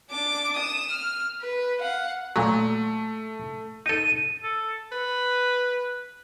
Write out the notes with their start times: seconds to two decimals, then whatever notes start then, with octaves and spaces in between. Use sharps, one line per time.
0.10 D4 D6
0.56 D#6 E7
0.91 F6
1.41 B4
1.81 F5 F#5
2.36 A#2 F#3 A3
3.86 D#4 A4 D#7
4.43 A4
4.92 B4